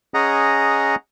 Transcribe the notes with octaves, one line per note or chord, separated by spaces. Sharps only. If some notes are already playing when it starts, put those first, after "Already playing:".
C#4 G#4 D#5 F#5 A#5